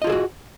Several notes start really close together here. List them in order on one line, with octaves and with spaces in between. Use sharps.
D#5 F4 G#4 A4 F#4